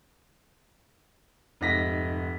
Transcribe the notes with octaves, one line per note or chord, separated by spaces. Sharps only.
F1 G#2 A#6 B6